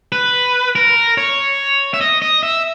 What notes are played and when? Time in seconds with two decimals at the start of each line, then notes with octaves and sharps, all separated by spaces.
0.12 B4
0.75 A#4
1.17 C#5
1.94 E5
2.01 D#5
2.22 D#5
2.43 E5